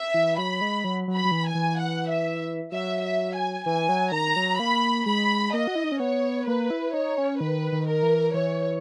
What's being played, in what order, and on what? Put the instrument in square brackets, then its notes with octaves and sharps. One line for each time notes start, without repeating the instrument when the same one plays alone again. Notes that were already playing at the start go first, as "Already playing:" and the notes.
Already playing: [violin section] E5
[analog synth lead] E3
[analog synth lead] F#3 [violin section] B5
[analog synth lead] G#3
F#3
F#3
[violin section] B5
[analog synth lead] F#3
E3
[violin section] G#5
[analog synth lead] E3
[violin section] F#5
E5
[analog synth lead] F#3 [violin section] E5
[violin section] E5
G#5
[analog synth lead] E3 [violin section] G#5
[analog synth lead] F#3
[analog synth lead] D#3 [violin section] A#5
[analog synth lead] F#3
[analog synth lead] A#3 [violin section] B5
[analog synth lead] G#3 [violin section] B5
[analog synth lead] A#3 [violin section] D#5
[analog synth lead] F#4
E4
D#4
C#4
[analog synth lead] B3 [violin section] C#5
[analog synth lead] A#3 [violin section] B4
[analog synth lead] E4
[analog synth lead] D#4 [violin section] C#5
[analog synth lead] C#4
[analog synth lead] D#3 [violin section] B4
[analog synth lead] D#3
[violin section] A#4
[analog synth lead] E3
[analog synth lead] E3 [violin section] C#5